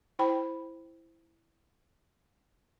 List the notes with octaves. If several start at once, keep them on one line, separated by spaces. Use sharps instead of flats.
E4 C5 G5 B5